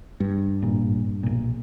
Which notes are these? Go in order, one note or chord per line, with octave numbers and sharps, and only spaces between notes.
G2
G#1 A#2
B1 A#2